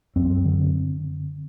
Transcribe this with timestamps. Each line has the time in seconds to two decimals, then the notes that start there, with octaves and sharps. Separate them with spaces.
0.16 F#2 C4
0.45 D3